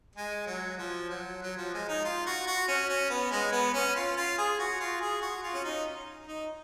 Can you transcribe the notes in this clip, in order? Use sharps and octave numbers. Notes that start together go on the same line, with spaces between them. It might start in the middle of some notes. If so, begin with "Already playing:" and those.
G#3
F#3
F3
F#3
F#3
F3
G#3
D#4
F4
F#4
F#4
C#4
C#4
B3
G#3
B3
C#4
F4
F4
G#4
F#4
F4
G#4
F#4
F4
C#4
D#4
D#4